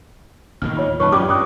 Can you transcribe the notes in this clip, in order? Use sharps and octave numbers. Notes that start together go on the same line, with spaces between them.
D#2 A2 D#3 F6
F4 C#5
F#2 A#2 D#3 B4 A5 C#6
F#2 F4 G4 D5 D6 F6
G2 C#4 D6 D#6 F#6